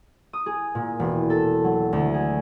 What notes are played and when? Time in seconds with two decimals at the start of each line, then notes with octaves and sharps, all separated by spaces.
0.33 D#6
0.46 G#4
0.75 A#2
0.99 E1
1.30 A4
1.64 F#3
1.93 D2
2.14 G#4